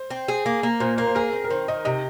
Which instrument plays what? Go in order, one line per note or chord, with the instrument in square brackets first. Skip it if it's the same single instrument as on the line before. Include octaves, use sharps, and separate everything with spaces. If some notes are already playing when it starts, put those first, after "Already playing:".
Already playing: [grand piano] C5
[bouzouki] C4
G#4
A#3
A#3
[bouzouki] A#2 [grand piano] C5
[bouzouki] A#3 [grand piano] A#4
[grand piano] C5
[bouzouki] G#4 [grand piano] A#4
[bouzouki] C4
[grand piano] A#4
[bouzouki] D#3 [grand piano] C5
[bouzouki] D#3 [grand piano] D#5
[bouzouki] C3 [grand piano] D#5